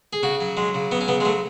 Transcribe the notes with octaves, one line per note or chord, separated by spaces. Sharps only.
G#4
C#3 F#4
F#3
F#3 G#3
C#3
F#3 B3
C#4
C#3 B3
G#3
F#3 A3